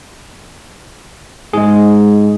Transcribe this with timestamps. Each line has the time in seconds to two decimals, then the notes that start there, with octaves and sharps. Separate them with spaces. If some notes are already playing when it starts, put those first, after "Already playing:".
1.53 G#2 G#3 G#4